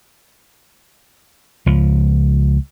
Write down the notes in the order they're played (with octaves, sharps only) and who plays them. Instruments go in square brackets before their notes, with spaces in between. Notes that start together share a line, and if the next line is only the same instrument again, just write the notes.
[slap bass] C#2 F3